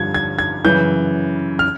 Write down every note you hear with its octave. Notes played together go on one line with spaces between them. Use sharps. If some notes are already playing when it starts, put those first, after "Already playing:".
Already playing: G2 D3 F3 G#6
G#6
G#6
F#2 C#3 E3 G6
F6